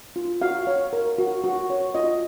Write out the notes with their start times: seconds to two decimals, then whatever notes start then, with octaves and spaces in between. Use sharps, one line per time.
0.16 F4
0.42 F#4 F5
0.67 C#5
0.93 A#4
1.18 F#4
1.44 F#4
1.70 C#5
1.95 F4 D#5